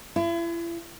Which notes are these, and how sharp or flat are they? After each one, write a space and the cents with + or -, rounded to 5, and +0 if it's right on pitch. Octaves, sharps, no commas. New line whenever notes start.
E4 +40